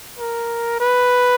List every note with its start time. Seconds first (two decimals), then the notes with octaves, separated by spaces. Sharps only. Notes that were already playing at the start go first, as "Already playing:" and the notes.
0.19 A#4
0.80 B4